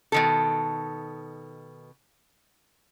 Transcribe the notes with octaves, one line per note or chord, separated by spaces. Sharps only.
B2 D#3 A4